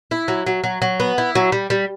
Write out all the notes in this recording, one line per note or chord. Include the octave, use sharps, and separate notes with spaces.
E4
F#3
F#3
F#3
F#3
B3
E4
F#3
G3
G3